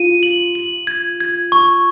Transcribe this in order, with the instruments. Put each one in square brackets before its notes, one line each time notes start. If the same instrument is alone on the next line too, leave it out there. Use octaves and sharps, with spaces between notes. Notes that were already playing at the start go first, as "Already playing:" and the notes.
Already playing: [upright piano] F4 [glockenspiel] D#7
[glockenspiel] F#7
F#7
G#6
G#6
C#6